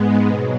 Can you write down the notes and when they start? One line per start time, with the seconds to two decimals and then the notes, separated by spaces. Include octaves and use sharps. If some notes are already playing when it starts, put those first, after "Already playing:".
Already playing: G#2 G#3 B3
0.26 B2 F#3